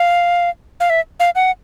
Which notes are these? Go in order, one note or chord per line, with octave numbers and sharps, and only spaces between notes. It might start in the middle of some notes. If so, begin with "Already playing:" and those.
Already playing: F5
F5
E5
F5
F#5